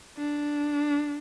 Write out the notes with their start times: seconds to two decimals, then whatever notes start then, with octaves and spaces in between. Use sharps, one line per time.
0.17 D4